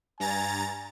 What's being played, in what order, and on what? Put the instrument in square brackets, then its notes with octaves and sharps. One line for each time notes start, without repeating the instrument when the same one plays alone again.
[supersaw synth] G2 A#5 A6 [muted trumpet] G#5